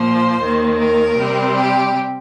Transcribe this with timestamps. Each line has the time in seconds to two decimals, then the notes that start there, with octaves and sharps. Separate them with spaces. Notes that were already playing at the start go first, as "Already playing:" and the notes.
Already playing: A#2 F3 A#3 C5
0.40 D#2 D#3 A#3
0.78 A#4
1.17 C3 G3 C4
1.55 G4